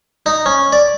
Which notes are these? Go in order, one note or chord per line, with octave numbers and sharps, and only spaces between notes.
D#4
C#4
D5